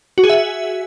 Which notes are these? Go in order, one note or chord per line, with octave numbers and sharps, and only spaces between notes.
F#4
G#4
E5